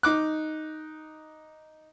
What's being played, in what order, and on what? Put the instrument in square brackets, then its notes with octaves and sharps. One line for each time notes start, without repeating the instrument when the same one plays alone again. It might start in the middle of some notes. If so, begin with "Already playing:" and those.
[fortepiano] D#4 D6 F#6